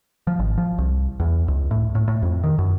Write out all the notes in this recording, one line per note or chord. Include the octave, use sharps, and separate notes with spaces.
F3
G#1
F3
C2
E2
C#2
A2
A2
A2
F2
D#3
F#2